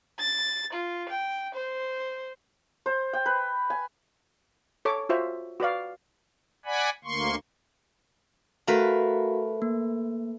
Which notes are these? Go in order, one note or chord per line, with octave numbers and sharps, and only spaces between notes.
A6
F4
G5
C5
C5
G5
B4
G#5
A4 C#5 D6
F4 F#4 C5 E5
F#4 B4 D5 F5
D5 F#5 G#5 B5
D2 A#3 C6 C#6
A3 F#4 A#4 B4 F5
A#3